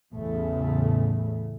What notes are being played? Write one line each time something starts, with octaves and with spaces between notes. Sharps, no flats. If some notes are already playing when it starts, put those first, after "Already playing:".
A1 E2 A2 C#3 A3